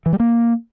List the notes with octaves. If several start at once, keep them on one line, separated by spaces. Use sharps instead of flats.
E3
G3
A#3